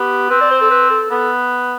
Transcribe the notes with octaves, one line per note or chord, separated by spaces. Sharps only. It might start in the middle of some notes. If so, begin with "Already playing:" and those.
Already playing: B3 G4
C4 B4
D5
C5
A4
B4
A4
B3 A4